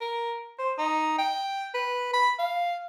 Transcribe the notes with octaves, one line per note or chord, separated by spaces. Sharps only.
A#4
C5
D#4
G5
B4
B5
F5